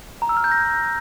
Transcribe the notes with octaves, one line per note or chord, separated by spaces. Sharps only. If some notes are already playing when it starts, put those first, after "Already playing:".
A#5
E6
F6
G6
A#6